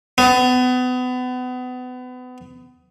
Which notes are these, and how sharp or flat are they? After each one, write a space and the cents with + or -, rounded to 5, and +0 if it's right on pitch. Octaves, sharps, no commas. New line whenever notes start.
B3 +30